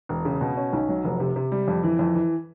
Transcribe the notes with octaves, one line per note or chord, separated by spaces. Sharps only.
E1
C#3
B2
C#4
B1
F#3
F1
C3
C3
G3
F2
E3
F2
E3